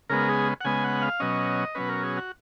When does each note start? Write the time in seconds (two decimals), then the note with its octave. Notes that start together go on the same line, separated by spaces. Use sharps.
0.09 C#3 G#3 B3 A#4
0.29 G#4
0.61 F#5
0.65 C#3 G#3 B3 G#5
0.84 F#5
1.02 F5
1.20 B2 F#3 C#4 D#5
1.75 B2 F#3 C#4 B4
1.89 A#4
2.03 G#4
2.17 F#4